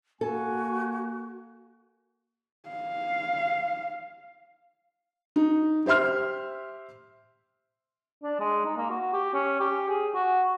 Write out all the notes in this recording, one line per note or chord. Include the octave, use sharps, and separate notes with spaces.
A#3 F#4 A4 G#5
F5
D#4
G4 C5 E5 C6 F6
D4
G#3
D#4
A#3
F#4
G4
C#4
G4
G#4
F#4